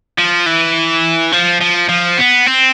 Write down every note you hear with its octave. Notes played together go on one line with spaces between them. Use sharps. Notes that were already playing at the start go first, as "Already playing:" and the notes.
F3
E3
F3
F3
F3
B3
C4